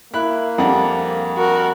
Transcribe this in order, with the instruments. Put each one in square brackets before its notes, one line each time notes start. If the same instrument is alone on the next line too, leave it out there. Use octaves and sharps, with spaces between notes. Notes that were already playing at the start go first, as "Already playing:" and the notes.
[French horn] A#3 [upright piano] E4 [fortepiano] B5 F#6
[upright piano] F2 G3 [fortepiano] D4 F#5
[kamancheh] F#4 A#4